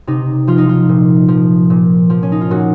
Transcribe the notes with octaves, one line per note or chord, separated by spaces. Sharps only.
C3 D#4
F3 F4
D#4
F4
A#2
F3
A#2
F3
C#4
D#4
F4
A#2 F#4